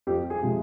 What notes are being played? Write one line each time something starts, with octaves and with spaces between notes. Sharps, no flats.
F2 G4
G#4
C3 F3 G#3